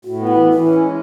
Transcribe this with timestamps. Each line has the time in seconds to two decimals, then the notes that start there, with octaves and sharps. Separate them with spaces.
0.04 A2 F#4
0.20 B3
0.27 E4
0.35 E3
0.50 E3 E4
0.65 C#4
0.80 G#3